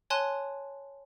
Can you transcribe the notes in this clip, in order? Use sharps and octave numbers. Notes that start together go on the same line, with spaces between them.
C#5 G#5 A5 C6 F#6